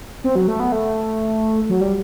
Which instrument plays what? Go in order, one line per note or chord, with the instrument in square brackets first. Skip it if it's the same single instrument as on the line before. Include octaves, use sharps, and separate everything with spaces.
[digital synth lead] C4
F#3
A3
B3
A3
F#3
G3